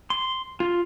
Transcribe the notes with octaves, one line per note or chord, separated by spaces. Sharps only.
C6
F4